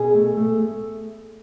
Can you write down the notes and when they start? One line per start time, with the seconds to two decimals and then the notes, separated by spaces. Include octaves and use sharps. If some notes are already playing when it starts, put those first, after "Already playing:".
Already playing: B2 G#4
0.14 A3
0.37 A3
0.61 A3